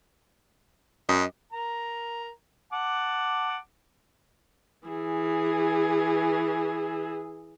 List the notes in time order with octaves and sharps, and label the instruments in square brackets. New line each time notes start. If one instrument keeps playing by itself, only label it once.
[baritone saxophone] F#2 [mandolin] D#5
[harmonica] A#4 A#5
F#5 A5 D6
[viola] E3 G#4